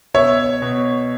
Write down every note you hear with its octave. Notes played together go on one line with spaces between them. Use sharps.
B2 C#5 E5
B2